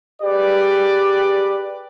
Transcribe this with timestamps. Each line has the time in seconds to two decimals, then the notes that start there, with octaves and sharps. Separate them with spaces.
0.22 G4 G#4 B4 D5